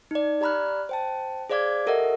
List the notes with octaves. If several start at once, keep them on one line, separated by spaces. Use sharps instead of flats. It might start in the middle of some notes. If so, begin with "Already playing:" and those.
D#4 D5
G4 D5 A#5 B5 F6 F#6
C5 G5 A5
G#4 C5 D5 F5 D6 G#6
G4 A4 A#4 D#5 E5 F#5